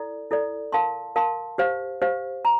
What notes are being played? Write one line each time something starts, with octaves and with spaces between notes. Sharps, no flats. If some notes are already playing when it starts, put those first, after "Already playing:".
Already playing: E4 A4 D5
E4 A4 D5
A#4 F5 A5 C6
A#4 F5 A5 C6
G4 C5 F5
G4 C5 F5
A#5